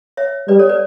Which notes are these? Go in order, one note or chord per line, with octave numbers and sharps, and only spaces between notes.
C#5 E5
G3 B4 D5
A4 C#5
B4 D5